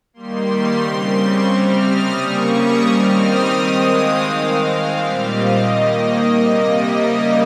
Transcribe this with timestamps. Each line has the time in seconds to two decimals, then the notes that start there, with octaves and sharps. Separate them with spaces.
0.14 D#3 G3 A#3 C6
0.83 C#3 G3 C4
1.17 C#6
1.50 C3 G3 C4 F6
1.85 D#6
2.19 C#3 G3 A#3 C#6
2.53 D#6
2.87 D#3 G3 C4 F6
3.21 D#6
3.55 D#3 G#3 C4
3.90 F5
4.24 D#3 G#3 C4
4.58 F5
4.92 A#2 G3 C4 F5
5.27 D#5
5.60 D#3 A#3
6.28 C3 G3 A#3 D#5
6.96 C#3 G3 A#3